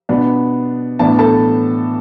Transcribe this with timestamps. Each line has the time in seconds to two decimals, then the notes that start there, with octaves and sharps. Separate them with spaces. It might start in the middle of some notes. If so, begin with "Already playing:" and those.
0.09 B2 B3 D4
0.99 A2 E3 B3 D4 A5
1.19 A4 A5